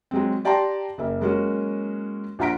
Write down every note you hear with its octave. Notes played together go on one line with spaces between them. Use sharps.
F#3 G#3 C4
G4 D5 G5 A5 A#5 C6
F#1 A#3 E5
F#3 G#3 A#3 C#4 F#4
A#1 F4 F#5 A#5 B6 D7